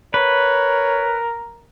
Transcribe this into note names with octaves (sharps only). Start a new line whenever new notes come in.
A#4 B4 C#5